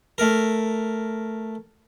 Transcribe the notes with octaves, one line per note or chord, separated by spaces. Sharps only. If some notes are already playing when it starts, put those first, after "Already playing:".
A3 A#4